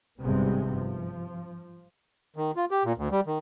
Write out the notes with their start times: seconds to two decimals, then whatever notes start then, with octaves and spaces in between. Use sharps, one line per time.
0.19 G#1 G2 C3 G#3 B3
0.71 F3
2.36 D#3
2.56 F4
2.71 G4
2.85 A#2
2.98 D2
3.11 G3
3.27 D#3